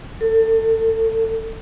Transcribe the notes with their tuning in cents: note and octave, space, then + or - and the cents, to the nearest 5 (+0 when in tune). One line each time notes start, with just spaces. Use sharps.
A4 +30